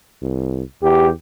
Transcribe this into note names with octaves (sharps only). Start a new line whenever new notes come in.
C2
E2 G4